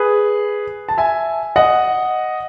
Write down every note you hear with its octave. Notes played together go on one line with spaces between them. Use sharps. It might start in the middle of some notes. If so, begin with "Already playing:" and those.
Already playing: G#4 B4
A5
E5 G#5
D#5 F#5